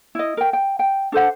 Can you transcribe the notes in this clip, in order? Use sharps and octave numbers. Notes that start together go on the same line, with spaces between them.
E4 D#5
A#4 G5
G5
G5
D4 A4 C5 F#5